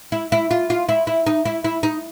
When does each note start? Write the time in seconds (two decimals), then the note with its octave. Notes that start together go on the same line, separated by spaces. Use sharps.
0.12 E4
0.32 E4
0.51 F4
0.70 F4
0.89 E4
1.07 E4
1.27 D#4
1.45 E4
1.64 E4
1.83 D#4